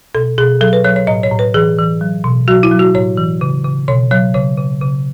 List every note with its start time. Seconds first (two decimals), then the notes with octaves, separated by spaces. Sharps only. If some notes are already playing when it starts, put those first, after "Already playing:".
0.15 B2 A4
0.38 B2 G#4
0.61 F#3 A4
0.73 B4
0.84 F#3 C#5
0.96 C#5
1.07 A2 D#5
1.23 C#5
1.31 A2
1.39 B4
1.54 E3 G#4
1.78 E3
2.01 F#3
2.24 B2
2.48 F#3 F#4
2.63 E4
2.71 F#3
2.79 F#4
2.95 A2 C#5
3.17 E3
3.41 C#3
3.65 C#3
3.88 B2 C#5
4.11 F#3 C#5
4.34 C#3 C#5
4.58 C#3
4.81 C#3